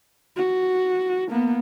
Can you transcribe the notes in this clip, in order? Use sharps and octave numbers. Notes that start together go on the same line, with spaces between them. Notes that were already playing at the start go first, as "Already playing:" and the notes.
F#4
A#3 B3